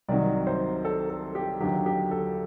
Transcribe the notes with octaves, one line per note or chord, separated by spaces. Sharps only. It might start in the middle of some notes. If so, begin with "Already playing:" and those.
C2 C3 D#3 F#3 D5
C5
A4
A4
G4
D#2 D3 F#3 G4
G4
A4